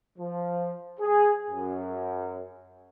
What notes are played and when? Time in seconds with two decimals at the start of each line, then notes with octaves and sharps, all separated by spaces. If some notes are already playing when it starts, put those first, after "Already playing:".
0.19 F3
1.00 G#4
1.50 F#2